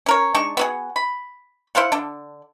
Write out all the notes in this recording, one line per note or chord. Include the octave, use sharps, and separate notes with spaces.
C#4 A#4 C#5
G#3 D4 D#4 C#6
B3 F#4 G#4
B5
E4 C5 F5 F#5
D3 D4